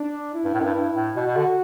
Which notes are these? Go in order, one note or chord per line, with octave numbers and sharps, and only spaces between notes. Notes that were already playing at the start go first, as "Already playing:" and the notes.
Already playing: D4
E4
G2
A2
F#2
G2
G2
A2
B2 F#4
B2
D3